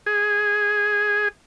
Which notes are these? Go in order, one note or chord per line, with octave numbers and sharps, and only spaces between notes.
G#4